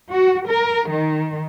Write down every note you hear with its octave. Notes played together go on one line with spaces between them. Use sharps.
F#4
A#4
D#3